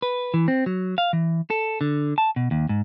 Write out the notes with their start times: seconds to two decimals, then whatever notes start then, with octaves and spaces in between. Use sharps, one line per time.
0.02 B4
0.34 E3
0.48 C4
0.66 F#3
0.98 F5
1.13 E3
1.50 A4
1.81 D3
2.18 A5
2.36 B2
2.51 D#2
2.69 G#2